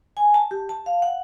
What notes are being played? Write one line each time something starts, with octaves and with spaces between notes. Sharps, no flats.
G#5
A5
G4
A5
F5
F#5